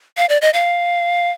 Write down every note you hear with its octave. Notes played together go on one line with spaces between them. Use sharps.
F5
D5
D#5
F5